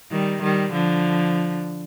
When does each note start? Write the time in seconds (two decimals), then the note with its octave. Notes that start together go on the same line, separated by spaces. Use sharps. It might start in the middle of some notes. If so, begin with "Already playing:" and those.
0.11 D#3 G3
0.42 D#3 G3
0.72 D3 F3